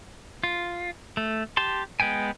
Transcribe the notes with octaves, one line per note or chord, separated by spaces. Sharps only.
F4
A3
G4 A5 C6
G#3 B3 G5 G#5